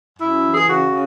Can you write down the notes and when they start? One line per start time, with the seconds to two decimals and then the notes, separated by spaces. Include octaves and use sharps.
0.18 F#2 E4
0.42 E3
0.54 G#4
0.66 C#3 F#4
0.90 C#3